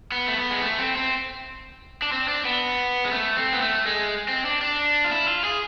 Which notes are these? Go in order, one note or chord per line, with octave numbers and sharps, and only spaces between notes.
B3
A3
B3
G#3
A3
C4
C4
D4
C4
D4
B3
G#3
A3
C4
B3
A3
G#3
C4
D4
D4
F4
E4
F4
G#4